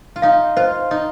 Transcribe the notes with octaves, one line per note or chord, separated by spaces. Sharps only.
F4
D#4 F5
F4 C5
D#4 D#5